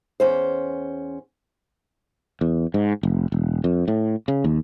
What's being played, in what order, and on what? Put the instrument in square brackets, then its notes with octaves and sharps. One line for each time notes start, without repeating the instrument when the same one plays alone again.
[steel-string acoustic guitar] E2 C#4 C5
[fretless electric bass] E2
G#2
F1
E1
F2
A2
C#3
D#2